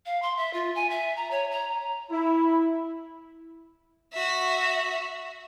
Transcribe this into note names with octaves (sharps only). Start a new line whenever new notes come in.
F5
C6
E5
F4
G#5
E5
A#5
C#5
A#5
E4
F#4 E5